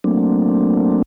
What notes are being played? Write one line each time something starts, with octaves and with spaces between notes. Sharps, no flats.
F#3 A3 A#3 C4 D4